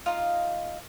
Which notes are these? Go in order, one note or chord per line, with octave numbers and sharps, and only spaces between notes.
D#4 F4 D#5 F5